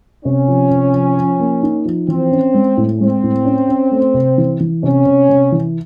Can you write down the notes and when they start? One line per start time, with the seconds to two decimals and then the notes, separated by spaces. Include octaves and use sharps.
0.24 C3 C#4
0.48 F3
0.71 C3
0.94 F3
1.17 F3
1.40 A#3
1.63 D#4
1.85 F3
2.08 E3 C4
2.32 C#4
2.54 G#3
2.77 A2
3.00 G#3 C4
3.23 A2
3.45 C#4
3.68 C#4
3.91 A3
4.14 C3
4.38 E3
4.60 E3
4.83 C3 C#4
5.06 C3
5.29 C3
5.52 E3